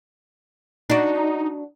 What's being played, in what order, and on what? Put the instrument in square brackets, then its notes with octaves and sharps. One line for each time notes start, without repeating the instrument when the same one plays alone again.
[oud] D4 F#4 [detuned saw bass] D#4